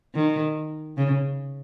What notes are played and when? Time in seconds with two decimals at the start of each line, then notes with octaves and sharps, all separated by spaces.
0.15 D#3
0.97 C#3